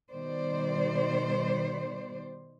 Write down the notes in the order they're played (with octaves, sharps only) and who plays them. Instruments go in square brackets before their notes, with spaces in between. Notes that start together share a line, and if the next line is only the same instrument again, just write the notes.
[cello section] B2 D#3 G3 C5 D5